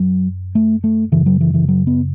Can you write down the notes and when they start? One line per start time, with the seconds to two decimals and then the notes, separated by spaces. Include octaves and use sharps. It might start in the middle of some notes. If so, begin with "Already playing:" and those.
Already playing: F#2 F#3
0.55 A3
0.84 A3
1.12 F#2 C#3 E3
1.26 F#3
1.41 E3
1.54 E3
1.68 F#3
1.87 B3